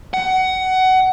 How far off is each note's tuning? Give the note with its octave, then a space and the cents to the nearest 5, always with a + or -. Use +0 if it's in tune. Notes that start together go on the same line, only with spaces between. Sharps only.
F#5 +20